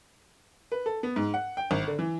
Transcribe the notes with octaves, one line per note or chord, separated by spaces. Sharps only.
B4
A4
B3
G#2
F#5
G5
G#1
D3
E3